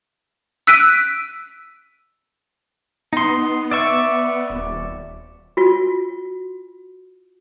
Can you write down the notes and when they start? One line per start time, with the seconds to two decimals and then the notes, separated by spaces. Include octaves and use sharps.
0.67 E6 F#6 B6 D7 D#7
3.13 B3 D#4 C6
3.71 D5 E5 C#6
4.50 D#1
5.57 F4 F#4